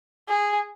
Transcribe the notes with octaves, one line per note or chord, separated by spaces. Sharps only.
G#4